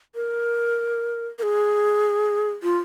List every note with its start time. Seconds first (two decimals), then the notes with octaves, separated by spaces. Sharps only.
0.15 A#4
1.39 A#4
1.43 G#4
2.63 F4